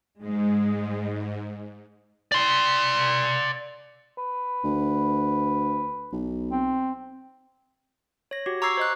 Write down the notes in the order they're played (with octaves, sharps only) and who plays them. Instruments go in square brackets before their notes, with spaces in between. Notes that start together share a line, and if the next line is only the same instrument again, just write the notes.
[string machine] G#2 [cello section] G#3
[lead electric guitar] D5 C6
[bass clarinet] B4
[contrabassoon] D2
B1
[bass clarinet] C4
[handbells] C#5 A#6
F#4 G4
A#5 C#6 D6 E6 G#6 C7
C5 D#5 F#6